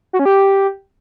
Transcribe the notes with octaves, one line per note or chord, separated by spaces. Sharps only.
F#4
C#4
G4